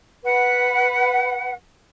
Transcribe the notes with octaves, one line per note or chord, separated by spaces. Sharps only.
B4 F#5